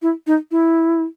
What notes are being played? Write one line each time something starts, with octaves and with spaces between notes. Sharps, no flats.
E4
D#4
E4